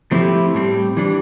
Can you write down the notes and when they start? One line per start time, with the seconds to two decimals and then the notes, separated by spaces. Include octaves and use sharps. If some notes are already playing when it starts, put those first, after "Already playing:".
0.11 F3 A3 C4 E4 G4
0.54 A2 G3 C4
0.97 E3 G3 D4